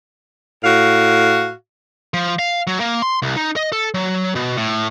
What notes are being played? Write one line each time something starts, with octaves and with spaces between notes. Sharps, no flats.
A2 F#4 F5
F3
F5
F#3
A#3
C6
C2
D#4
D#5
A4
F#3
B2
A2